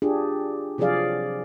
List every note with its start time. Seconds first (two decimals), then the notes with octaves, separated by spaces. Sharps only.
0.02 D4 F4 G4 G#4
0.78 C3 F3 F#3 G#4 D5 F5